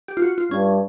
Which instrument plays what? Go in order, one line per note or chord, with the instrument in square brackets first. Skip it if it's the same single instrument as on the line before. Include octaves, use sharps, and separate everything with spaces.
[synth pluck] G4
F4
F#4
F4
[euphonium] G2 [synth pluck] C#4